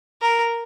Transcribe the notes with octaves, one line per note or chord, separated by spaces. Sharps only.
A#4